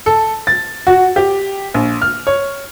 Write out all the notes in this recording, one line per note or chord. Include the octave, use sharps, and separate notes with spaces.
A4
A6
F#4
G4
A#1
F6
C#5